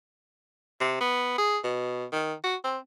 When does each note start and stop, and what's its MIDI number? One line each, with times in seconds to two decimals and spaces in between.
0.80 1.00 48
1.01 1.34 59
1.38 1.58 68
1.63 2.05 47
2.12 2.33 51
2.44 2.56 66
2.64 2.78 60